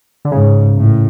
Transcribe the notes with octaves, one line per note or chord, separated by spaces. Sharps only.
D3
G#2 C#3
A2